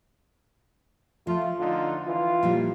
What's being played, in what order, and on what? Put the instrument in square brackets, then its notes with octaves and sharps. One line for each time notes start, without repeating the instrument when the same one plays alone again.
[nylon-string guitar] F3 [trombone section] A3 F4
[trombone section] D3 D#4 F4
E3 F4
[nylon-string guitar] A#2 F3 G3